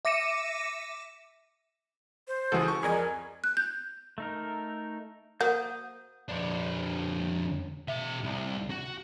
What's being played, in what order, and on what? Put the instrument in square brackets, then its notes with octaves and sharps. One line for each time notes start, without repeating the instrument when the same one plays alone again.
[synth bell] E5 D6 A#6 C#7 D#7 E7
[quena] C5
[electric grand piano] C#2 G#3 G#4 [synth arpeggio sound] E3 F#4 A4
[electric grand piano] C#6
[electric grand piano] F2 D5 G#6 [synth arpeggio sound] G#4 A#4 D#5 [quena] G#5
[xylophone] F#6
G6
[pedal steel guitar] A3 D#4 A#4
[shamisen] A#3 F#4 [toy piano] C5 F#5 [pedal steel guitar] D#6 G6
[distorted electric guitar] F2 D4
B2 E5
C2
F#4